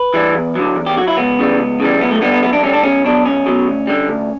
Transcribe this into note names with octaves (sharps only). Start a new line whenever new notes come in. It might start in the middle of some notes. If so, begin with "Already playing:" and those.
Already playing: B4
E3 G3
E2
D3 F#3
E2
G4
D3 F#3 F#4
E4
C#2 B3
C#3 E3 G3
C#2
C#3 E3 G3
F#2 B3
A3
D3 G3 B3
B3
F#2 B3
D4
D3 G3 C#4
D4
B1 C#4
B2 F#3 D4
B1 C#4
B2 F#3
D2
D3 G3
D2